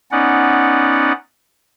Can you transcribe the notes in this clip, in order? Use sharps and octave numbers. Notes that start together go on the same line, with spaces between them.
B3 C#4 D#4 D5 F#5